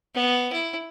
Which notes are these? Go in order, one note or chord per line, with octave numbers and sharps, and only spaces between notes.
B3
E4